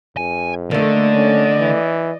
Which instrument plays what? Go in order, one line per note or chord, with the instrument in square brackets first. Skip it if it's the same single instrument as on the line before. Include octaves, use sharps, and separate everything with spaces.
[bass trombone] F2 [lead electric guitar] G#5
[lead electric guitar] D3 [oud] A3 A#3 [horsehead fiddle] D5 D#5
[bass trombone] C#4
E3